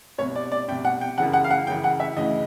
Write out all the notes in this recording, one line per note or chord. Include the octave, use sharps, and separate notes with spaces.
C2 B2 C#5
D5
D5
C2 B2 G5
F#5
G5
F#2 C#3 E3 F#5
F#5
F5
F#5
F#2 C#3 E3 G5
F#5
E5
D2 C#3 E3 D#5